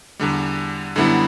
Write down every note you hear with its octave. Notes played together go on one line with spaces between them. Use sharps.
E2 D3 G3
F#2 D3 G3 B3 E4